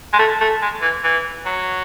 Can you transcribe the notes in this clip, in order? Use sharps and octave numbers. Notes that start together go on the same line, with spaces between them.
G#3
A3
A3
G#3
E3
E3
F#3